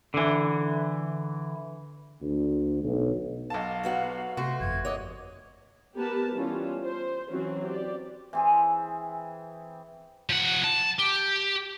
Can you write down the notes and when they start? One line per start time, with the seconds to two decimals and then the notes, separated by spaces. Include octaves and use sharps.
0.14 D3 E3
2.21 D2
2.83 B1
3.50 B1 F5 A5
3.83 F#3 B3 F#4
4.37 C3 A3 F#4 C6
4.60 G1 F2 G#6
4.85 C#5 D#5 F#5 D6
5.96 B3 G4 A#4 B4 A5
6.32 E3 G3 C#4 F4
6.84 C5
7.31 E3 F#3 C4 C#4 F#4
7.66 G4 D5
8.33 E3 C4 G#4
10.30 F3 F#5
10.64 A5
10.99 G4